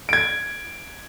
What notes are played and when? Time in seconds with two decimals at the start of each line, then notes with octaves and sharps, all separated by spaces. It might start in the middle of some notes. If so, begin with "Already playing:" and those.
0.09 G#6 D7